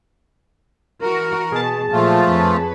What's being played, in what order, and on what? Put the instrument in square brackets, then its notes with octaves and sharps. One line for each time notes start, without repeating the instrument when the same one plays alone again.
[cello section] E3 F#4 [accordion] A#4
[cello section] B2 [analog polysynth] G#4 A5
[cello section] A#2 F#3 [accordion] F3 A3 F4
[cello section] F2 B4 C#5